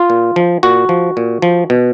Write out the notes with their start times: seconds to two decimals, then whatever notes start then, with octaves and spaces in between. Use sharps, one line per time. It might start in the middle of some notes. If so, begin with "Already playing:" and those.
Already playing: F4
0.10 A#2
0.36 F3
0.63 A#2 F#4
0.89 F3
1.17 A#2
1.42 F3
1.70 B2